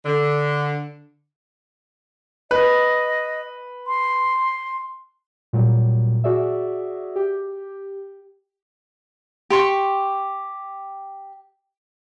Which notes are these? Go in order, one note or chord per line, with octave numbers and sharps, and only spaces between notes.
D3
B4 D#5
C6
A#2 F#3 G3
F#4 G#4 D5 E5
G4
G4 C6 C#6